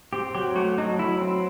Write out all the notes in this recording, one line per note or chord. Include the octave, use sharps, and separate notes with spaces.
C4 G4
F#3 G4
A3 F#4
F#3 D#4
F#3 E4
C4